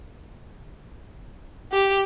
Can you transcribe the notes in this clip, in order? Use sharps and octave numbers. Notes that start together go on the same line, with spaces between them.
G4